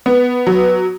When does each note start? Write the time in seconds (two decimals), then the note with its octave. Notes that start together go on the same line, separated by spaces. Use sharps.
0.06 B3
0.47 F#3